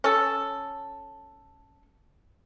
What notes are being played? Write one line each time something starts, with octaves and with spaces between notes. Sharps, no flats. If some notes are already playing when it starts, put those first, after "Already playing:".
C#4 A4